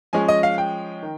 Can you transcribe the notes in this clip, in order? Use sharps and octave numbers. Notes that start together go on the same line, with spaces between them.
F3 G#3 C#4 G#5
D#5
F5
G5
D#3